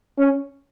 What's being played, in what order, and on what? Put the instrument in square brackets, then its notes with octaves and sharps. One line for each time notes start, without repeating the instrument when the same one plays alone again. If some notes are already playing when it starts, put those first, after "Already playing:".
[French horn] C#4